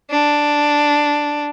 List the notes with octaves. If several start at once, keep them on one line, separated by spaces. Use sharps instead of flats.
D4